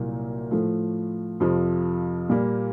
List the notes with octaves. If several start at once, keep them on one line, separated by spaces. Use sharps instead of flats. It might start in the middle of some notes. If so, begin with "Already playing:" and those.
Already playing: C2 A#2 F#3 A#3
A2 F3 A3
F2 C3 F3
A#2 G3 A#3